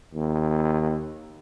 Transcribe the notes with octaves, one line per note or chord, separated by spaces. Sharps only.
D#2